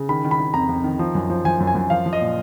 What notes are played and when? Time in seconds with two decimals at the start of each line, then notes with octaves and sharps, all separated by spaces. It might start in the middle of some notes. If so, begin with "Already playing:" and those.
Already playing: C#3
0.09 D#3 B5
0.25 D#3
0.31 B5
0.39 D#3
0.54 F2 A#5
0.69 F2
0.84 D#3
0.99 F3
1.15 F#2
1.30 F3
1.45 F3 G#5
1.60 F#2
1.67 G#5
1.75 F#2
1.90 F3 F5
2.06 F3
2.13 D#5
2.21 A#2